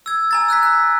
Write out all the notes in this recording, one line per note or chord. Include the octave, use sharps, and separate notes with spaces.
E6 G#6
G#5 A#5 A6
E6 F#6 G#6 B6
F#6